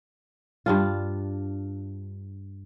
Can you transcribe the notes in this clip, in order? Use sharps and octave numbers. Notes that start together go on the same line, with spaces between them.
G2 D4 F4